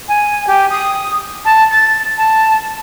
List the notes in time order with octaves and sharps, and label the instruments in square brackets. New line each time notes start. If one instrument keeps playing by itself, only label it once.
[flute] G#5
G4
D#6
A5
A6
A5